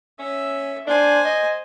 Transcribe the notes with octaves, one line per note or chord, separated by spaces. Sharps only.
C#4 E5
D4 C5 G#5
D#5